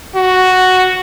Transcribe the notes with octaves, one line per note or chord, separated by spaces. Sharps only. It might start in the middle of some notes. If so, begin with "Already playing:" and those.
F#4